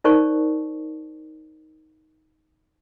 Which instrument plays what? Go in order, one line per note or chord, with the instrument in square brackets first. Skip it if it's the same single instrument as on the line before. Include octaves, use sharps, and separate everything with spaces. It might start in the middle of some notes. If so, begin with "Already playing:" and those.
[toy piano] D#4 A#4 C5 D5 A5 C#6